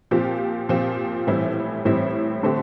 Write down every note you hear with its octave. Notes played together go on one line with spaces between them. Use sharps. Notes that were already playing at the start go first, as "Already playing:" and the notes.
A#2 F3 C4 G4
A#2 F3 C4 G4
A2 E3 G3 C4 E4
A2 E3 G3 C4 E4
D3 A3 C4 G4